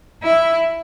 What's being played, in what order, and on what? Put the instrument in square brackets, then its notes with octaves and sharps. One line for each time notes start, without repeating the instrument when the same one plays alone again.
[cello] E4